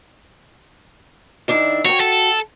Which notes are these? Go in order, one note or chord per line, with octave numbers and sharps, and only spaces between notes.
D#3 D4 E4
F#4 C#5 G5
A4